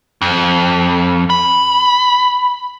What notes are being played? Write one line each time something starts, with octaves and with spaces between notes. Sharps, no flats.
F2
B5